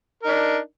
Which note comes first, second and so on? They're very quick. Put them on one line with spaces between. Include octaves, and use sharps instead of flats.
A#4 D#4 D4